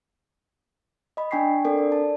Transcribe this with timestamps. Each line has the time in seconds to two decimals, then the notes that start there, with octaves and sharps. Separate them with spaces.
1.17 D#5 B5
1.31 D4 G5 G#5 C#6 B6 C7
1.65 C4 D4 A4 A#4 D5
1.78 D5
1.92 A5